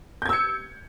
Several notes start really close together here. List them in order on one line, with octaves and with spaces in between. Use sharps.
G6 G#6 E6 C#7